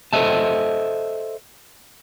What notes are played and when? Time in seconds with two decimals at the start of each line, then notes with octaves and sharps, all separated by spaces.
0.13 A4 C5 C#5 D#5 E5 A5